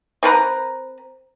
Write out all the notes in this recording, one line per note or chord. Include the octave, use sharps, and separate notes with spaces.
C4 A#4 B4 A#5